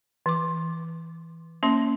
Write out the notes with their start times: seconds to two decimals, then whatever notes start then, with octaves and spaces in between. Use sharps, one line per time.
0.26 E3 D6
1.63 A#3 C#4 C6